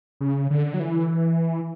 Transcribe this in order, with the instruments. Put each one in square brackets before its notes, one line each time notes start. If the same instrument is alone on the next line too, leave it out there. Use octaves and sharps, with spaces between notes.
[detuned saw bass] C#3
D3
F#3
E3